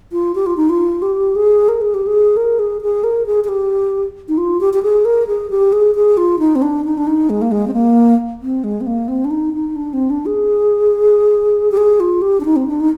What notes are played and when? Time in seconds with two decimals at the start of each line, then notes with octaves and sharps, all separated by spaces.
0.12 F4
0.35 G4
0.46 F4
0.57 D#4
0.69 F4
1.02 G4
1.36 G#4
1.69 A#4
1.81 G#4
1.94 G4
2.07 G#4
2.37 A#4
2.59 G#4
2.82 G#4
3.04 A#4
3.26 G#4
3.44 G#4
3.49 G4
4.28 D#4
4.38 F4
4.61 G4
4.74 G4
4.83 G#4
5.05 A#4
5.27 G#4
5.50 G4
5.72 G#4
5.95 G#4
6.17 F4
6.39 D#4
6.55 C4
6.62 D4
6.85 D#4
6.98 D4
7.07 D#4
7.30 G#3
7.42 A#3
7.52 G#3
7.68 C4
7.74 A#3
8.42 C4
8.64 G#3
8.81 C4
8.87 A#3
9.08 C4
9.25 D4
9.31 D#4
9.54 D#4
9.76 D4
9.93 C4
10.10 D4
10.26 G#4
11.72 G4
11.77 G#4
12.00 F4
12.22 G4
12.40 D4
12.45 D#4
12.56 C4
12.68 D4
12.80 D#4